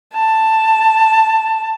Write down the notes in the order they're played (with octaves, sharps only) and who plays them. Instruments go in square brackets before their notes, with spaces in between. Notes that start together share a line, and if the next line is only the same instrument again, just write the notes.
[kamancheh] A5